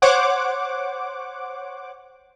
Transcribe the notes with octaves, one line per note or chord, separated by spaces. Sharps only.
C5 C#5 F#5 D6